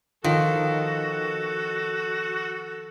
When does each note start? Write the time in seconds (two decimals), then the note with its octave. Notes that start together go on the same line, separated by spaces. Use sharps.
0.24 D#3 F3 F#4 A4